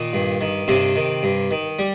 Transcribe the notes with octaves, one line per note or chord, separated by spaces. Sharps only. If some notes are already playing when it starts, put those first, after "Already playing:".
Already playing: A#2 D#3 A#3
G2
D#3
G2 C3 C4
D#3
G2
D#3
G3